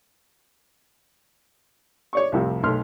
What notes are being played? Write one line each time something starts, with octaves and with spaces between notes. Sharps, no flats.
C#5 D5 C#6
C2 F2 A2 C3 F3
B1 A3 C6 F6